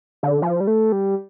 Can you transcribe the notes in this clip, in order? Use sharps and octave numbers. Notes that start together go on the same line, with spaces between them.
D3
F3
G3
A3
G3